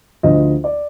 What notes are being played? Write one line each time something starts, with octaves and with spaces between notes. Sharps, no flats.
D2 D3 F3 D#5
D5